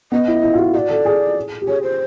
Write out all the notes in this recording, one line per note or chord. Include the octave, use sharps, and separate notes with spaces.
B3 D#5
E4
E4
F4
F#4
F#4 D5 D#5
A4
G#4
G4
G#4 C#5
C5